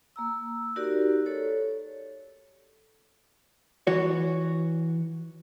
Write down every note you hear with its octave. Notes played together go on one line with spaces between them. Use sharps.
A#3 A#5 E6
D#4 F#4 G4 A#4 D5
A4 C#5
E3 F#4 C#5